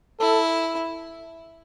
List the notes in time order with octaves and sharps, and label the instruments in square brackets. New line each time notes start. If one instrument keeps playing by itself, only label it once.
[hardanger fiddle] E4 [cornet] A4